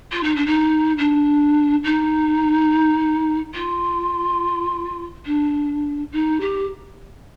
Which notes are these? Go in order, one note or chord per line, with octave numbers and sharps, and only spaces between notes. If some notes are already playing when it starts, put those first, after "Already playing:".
F4
D#4
D4
D#4
D4
D#4
F4
D4
D#4
G4